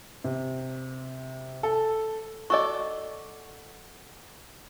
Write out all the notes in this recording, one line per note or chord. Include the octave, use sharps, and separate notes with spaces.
C3
A4
F#4 A4 D5 D#5 C#6